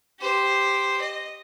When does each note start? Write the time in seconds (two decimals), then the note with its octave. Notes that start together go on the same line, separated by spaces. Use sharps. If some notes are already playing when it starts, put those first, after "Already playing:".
0.20 G4 C5
1.02 D#5